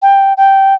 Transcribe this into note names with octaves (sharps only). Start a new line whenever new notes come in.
G5
G5